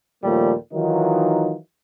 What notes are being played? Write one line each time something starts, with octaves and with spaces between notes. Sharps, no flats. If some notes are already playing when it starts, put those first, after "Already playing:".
D#2 A#2 F3 G3 A3
D#3 E3 F#3 D#4 F4